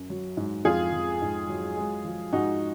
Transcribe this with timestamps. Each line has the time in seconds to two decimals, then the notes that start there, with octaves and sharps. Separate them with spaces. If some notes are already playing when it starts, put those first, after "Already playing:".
Already playing: F#2
0.10 F#3
0.37 G#2
0.65 F2 F4 G#4
0.93 F2
1.22 G#2
1.49 F#3
1.77 G#3
2.05 F3
2.33 G#2 D#4 F#4